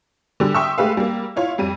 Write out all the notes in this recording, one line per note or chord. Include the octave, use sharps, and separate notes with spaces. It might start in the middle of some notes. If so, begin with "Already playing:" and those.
D3 G3
E5 G5 C6 C#6 D#6 E6
G#3 A3 G4 B4 F5
G3 A#3
E4 F4 C#5
F2 G3 D#7